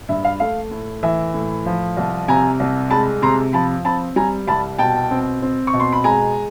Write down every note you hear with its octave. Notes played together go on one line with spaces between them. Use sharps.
G2 E5
F5
A3 F5
A2
E3 E5
A2
F3
C2
C3 G#5 A#5
C2
G#3 A5 B5
C3 A#5 C6
F3 A5 B5
C4 A5 B5
G3 G#5 A#5
C2 A5 B5
B2 G5 A5
C4
C4
C#6
B2
C6
B5
G#3 G#5 A#5